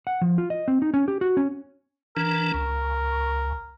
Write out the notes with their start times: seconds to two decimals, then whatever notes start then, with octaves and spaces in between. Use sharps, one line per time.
0.07 F#5
0.21 F3
0.38 F4
0.50 D#5
0.68 C4
0.82 D#4
0.94 C#4
1.08 G4
1.21 F#4
1.37 C#4
2.17 E3 D4 A#4
2.54 C#2